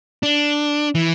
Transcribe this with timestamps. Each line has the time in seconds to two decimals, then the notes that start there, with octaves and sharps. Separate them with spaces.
0.23 D4
0.95 E3